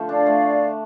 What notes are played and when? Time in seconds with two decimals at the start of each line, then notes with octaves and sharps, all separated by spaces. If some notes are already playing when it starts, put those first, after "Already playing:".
Already playing: D3 F3 A3
0.08 D4 D5 F5
0.26 A3